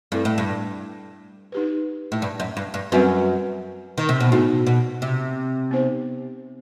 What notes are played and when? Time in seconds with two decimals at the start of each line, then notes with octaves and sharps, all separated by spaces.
0.12 G2 A3 C4 E4 A4
0.25 A2
0.38 G2
1.52 D#4 G4 B4
2.12 A2
2.22 G2
2.40 F#2
2.57 G2
2.74 G2
2.92 F#2 G3 C4 F#4 B4
3.98 D#3
4.09 C3
4.20 B2
4.32 A2 B3 D#4 F#4
4.67 B2
5.02 C3
5.71 B3 D#4 G4 C5